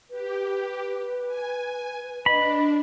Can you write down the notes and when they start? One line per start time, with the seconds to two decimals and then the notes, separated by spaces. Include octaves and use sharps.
0.11 G4 B4
1.27 G#5
2.26 D4 D#5 B5